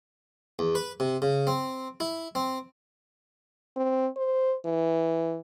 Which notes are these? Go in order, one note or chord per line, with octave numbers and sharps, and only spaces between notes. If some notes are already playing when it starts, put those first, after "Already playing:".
E2
B4
C3
C#3
C4
E4
C4
C4
C5
E3